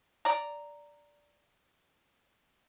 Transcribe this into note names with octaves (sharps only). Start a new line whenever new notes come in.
D5 A#5